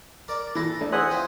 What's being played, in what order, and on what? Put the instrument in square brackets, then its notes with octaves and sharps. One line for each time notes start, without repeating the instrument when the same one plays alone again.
[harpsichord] A#4 D5
[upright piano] E3 B5 A#6 [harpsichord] A4 A5
[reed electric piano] A3 D4
[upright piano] C5 [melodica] E5 G#5 D#6 [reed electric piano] F#5 F#6
[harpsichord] F3 C4